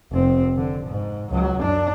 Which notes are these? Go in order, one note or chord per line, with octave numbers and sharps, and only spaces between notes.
F1 C4
D3
G#2
C#2 F#3
F#2 D4